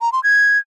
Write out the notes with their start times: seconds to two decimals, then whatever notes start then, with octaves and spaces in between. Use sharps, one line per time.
0.01 A#5
0.12 C6
0.24 G#6